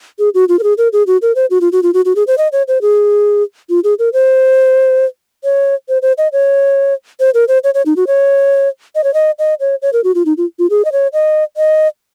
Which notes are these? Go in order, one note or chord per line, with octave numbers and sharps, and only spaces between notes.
G#4
F#4
F4
A#4
G#4
A#4
G#4
F#4
A#4
C5
F#4
F4
F#4
F4
F#4
F#4
G#4
C5
D#5
C#5
C5
G#4
F4
G#4
A#4
C5
C#5
C5
C5
D#5
C#5
C5
A#4
C5
C#5
C#5
D#4
F#4
C#5
D#5
C#5
D#5
D#5
C#5
C#5
A#4
F#4
F4
D#4
F4
F4
G#4
D#5
C#5
D#5
D#5